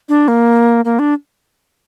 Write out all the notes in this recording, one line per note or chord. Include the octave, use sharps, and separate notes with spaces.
D4
A#3
A#3
D4